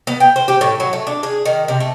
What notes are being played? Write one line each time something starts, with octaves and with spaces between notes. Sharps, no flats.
B3
G5
C5
G4
A2
F#3
A3
D4
G#4
D#3
C3
A3